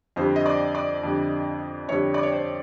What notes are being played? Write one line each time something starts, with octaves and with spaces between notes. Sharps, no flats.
F2 D3 G3 C5
D#5
D5
D5
F2 D3 G3
F2 D3 G3 C#5
D5
C#5
C5